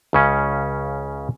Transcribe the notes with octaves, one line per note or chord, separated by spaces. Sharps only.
C#2 C#3 C#4